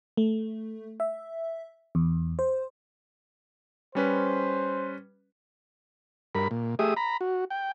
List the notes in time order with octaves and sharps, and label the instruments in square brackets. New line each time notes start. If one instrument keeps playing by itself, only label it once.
[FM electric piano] A3
E5
E2
C5
[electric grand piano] G3 C#4 B4 [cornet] C5
[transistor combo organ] G2 A#4 B5
A#2
A3 G4 G#4 E5 D#6
A#5 B5
F#4
G5